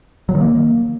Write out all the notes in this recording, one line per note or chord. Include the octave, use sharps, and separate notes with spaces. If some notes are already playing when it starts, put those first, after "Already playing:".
F#3
D#3
A#3